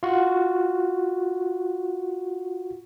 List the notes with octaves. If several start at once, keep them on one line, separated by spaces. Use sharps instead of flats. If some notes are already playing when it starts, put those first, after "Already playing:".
F4 F#4